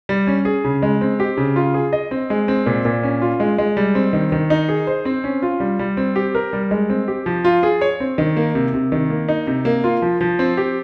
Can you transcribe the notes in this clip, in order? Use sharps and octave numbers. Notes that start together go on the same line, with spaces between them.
G3
C#4
G#4
C#3
G#3
C4
G4
C#3
F4
G#4
D#5
C4
G#3
C4
A#2
A#2
C#4
F4
G#3
G#3
G3
C4
D#3
D#3
D#4
G#4
C5
C4
C#4
F4
G3
G3
C4
G4
A#4
G3
G#3
C4
G4
F3
F4
G#4
C#5
C4
D#3
A#3
C3
C3
D#3
A#3
D#4
C3
A#3
F4
F3
F3
C4
G4